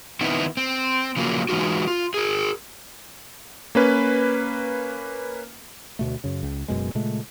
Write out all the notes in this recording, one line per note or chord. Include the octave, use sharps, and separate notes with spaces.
D#3 B3 C4 D#4 E4
C4
C#3 F3 F#3 A#3
E3 G#3 D#4 F4 F#4
F4
G#4 A#4
A#3 C#4 B4
D2 B2 A3
F#2 C#3
C#2
F#1 F#2 B2 G#3
A#2 C#3 G#3 A3